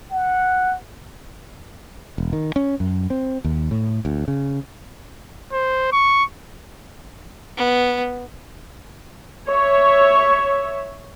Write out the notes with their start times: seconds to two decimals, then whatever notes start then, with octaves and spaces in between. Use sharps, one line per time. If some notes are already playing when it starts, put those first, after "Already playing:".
0.11 F#5
2.18 E1
2.33 D#3
2.56 C#4
2.80 F#2
3.10 C4
3.44 D#2
3.71 A2
4.05 D2
4.28 C#3
5.52 C5
5.92 C#6
7.57 B3
9.49 C#5 E5